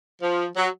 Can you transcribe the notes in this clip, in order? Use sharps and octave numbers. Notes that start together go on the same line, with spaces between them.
F3
F#3